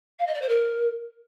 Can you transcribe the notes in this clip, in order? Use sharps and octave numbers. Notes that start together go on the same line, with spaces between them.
F5
D#5
D5
C5
A#4